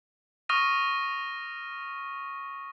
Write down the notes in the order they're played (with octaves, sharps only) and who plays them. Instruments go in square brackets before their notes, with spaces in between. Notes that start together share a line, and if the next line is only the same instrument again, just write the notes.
[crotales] C#6 D#6 F6 A#6 D#7